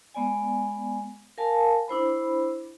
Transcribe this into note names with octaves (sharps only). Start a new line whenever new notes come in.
G#3 B3 D5 G#5
A#4 F5 G#5 A5
D4 E4 C5 B5